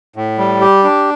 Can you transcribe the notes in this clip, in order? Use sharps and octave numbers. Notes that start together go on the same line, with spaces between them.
A2
G3
G4
D4